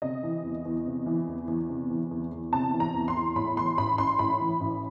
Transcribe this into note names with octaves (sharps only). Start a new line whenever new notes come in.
C3 D#5
E3
E2
E2
C3
E3
E2
E2
C3
E3
E2
E2
C3 A5
E3
A#5
E2
C6
E2
A2 B5
E3 C6
A1 B5
A1 C6
A2 B5
E3
A1